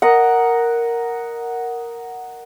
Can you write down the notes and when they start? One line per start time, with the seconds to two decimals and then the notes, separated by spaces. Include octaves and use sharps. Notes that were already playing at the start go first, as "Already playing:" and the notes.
0.02 A#4 D#5 F#5